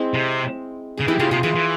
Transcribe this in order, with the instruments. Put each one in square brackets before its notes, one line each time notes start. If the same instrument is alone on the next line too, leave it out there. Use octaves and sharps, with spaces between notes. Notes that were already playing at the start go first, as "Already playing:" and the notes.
Already playing: [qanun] G#3 C4 E4
[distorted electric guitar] C3
[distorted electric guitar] C#3 [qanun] G#4
[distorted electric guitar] E3 [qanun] E4 G4
[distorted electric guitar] C#3 [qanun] F4 G#4
[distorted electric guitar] C3 [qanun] F4 G#4
[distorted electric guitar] E3 [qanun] F4 G#4
[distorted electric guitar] E3